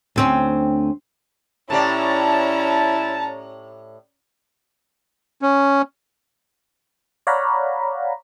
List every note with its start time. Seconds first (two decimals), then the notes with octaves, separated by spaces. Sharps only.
0.16 D2 C4 C#4
1.70 A2 C#4 E4 G4 D5 A5 A#5
5.42 C#4
7.27 C#5 D5 F5 F#5 A#5 B5